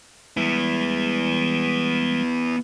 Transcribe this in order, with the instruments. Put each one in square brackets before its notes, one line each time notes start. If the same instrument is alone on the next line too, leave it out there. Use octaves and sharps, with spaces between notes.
[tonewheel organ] E3 G3 G#3 [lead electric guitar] B3 E4